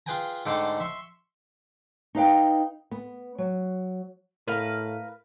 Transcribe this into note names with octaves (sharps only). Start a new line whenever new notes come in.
F4 G#4 B4 G5 G#5 A#5
G#2 D3 A3 D5 G5 C6
E5 C6 C#6
D#4 B4 F5 G5
B3
F#3
A2 A#4 B4 F5